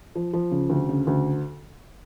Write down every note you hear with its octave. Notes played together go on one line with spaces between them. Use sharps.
F3
F3
C#3
D2
C#3
D2